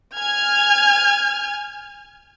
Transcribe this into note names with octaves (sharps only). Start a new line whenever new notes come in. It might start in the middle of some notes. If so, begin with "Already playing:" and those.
G#5 F6 G#6